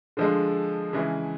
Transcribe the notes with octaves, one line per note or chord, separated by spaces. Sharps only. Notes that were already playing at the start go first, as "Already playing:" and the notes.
D3 F3 G#3
C#3 E3 G#3